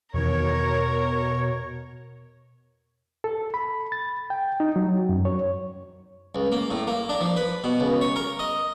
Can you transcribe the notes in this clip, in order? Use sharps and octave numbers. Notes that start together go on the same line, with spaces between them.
E2 B2 D#3 A#4 C#5
A4
B5
A6
G5
D#4
F#3
F#2
C#5
C#2
A#3
A2
A#3
D4
F3
B4
B2
C#2
C#5
A#4
D#5